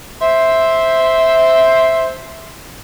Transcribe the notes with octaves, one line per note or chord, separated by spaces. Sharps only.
C5 E5